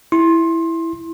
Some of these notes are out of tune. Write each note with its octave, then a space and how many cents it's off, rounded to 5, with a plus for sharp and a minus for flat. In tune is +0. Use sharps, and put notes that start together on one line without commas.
E4 +0 C6 +20